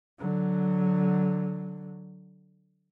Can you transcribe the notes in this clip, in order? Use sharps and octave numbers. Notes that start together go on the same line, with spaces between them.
D3 F#3